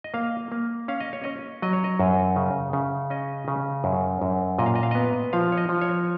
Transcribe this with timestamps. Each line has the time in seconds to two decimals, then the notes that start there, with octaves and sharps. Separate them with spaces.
0.04 D#5
0.14 A#3 F5
0.52 A#3
0.88 C#4 F5
1.00 D#5
1.13 C#5
1.24 C#4 D#5
1.62 F#3 D#5
1.73 C#5
1.84 D#5
1.99 F#2
2.36 C#3
2.73 C#3
3.10 C#4 D#5
3.48 C#3
3.84 F#2
4.22 F#2
4.59 A#2 D#5
4.66 F5
4.75 D#5
4.83 F5
4.91 B3 D#5
5.33 F3 F5
5.52 C#5
5.57 D#5
5.69 F3
5.81 C#5